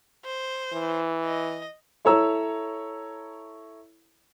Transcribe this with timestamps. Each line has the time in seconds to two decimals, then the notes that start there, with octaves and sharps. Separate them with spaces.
0.25 C5
0.73 E3
1.25 D#5
2.05 E4 A4 C#5 A#5 E6